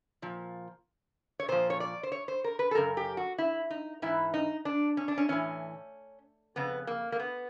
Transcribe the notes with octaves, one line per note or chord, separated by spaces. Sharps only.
A#2 F3
C#5
A#2 F3 C5
C#5
D5
C5
C#5
C5
A#4
B4
A4
F#2 C#3 A#4
G4
F#4
E4
D#4
G#2 E3 E4
D#4
D4
C#4
D4
C#4
A2 E3 C#4
F2 C#3 B3
A#3
A#3
B3